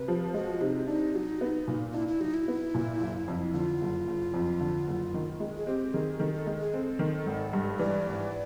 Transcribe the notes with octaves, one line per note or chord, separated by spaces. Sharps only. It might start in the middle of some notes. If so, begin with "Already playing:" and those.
Already playing: C3 B4
F3
G#3 F#4
C3 D#4
D4 D#4
F#3
B3
A#2
D4 E4
E4
F#3 D#4
E4
B3
A#2
F#1
F2
D3 F4
F#1
F#1
F2
D3
F#1
D#3
G#3
G#4
C4 G4
D#3 G#4
D#3 A4
A4
G#3
G#4
C4 A4
D#3
G#1
G2
E3 D5
G#1